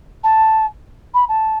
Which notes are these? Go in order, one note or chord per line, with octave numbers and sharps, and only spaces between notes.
A5
B5
A5